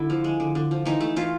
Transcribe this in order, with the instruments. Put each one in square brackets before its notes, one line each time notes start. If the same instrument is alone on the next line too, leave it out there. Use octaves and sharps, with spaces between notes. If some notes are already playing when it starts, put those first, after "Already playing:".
Already playing: [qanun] D3 E4
F3
G#3
D3
D3
F3
E3 D#4
A3
E3 F4